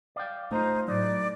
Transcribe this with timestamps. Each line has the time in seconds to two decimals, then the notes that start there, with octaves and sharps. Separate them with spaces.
0.16 D5 F5 G5
0.51 A3 D#4 F4 C5
0.88 A2 F#3 D#4 D5